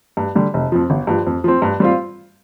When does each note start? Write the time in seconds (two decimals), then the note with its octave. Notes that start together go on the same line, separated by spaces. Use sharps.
0.17 G2
0.35 D3 G3
0.54 F1
0.72 F2 F3
0.90 G1
1.07 G2 F3
1.27 F2
1.44 F3 C4
1.62 G2
1.80 G3 C4 F4